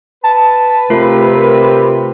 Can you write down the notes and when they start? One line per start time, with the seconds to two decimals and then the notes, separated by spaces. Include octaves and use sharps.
0.24 B4 A5
0.90 C3 A3 F4 A#4 C7